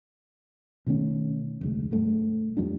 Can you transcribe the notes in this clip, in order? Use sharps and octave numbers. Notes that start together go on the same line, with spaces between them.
B2 D#3 A3 C#4
F1 D2 G#3
B1 G2 A3
F2 F3 G3 D4